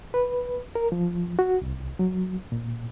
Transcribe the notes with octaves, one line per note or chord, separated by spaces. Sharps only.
B4
A#4
F3
F#4
C2
F#3
A#2